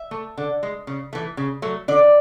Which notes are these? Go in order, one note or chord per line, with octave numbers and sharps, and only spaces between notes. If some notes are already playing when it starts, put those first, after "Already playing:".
Already playing: E5
A3
D3
G#3
C#3
E3 A3
C#3
F#3 A3
D3 D5